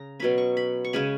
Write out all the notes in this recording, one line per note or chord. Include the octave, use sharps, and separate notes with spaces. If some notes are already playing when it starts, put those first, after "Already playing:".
Already playing: C#3 A#5
B2 F#3 C#4 B5
C#6
B5
C#6
C#3 G#3 C#4 B5